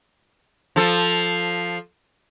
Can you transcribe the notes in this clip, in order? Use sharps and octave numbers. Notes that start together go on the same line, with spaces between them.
F3 A4